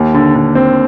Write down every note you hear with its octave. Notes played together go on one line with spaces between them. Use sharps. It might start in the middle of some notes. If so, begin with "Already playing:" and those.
Already playing: D#2
D3
D3
C4